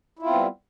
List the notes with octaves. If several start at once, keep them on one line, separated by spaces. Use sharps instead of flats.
G3 B3 C4 E4 F4